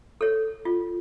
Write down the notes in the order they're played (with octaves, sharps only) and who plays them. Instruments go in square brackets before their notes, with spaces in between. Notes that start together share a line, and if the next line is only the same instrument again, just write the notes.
[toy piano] A4 C#5
F4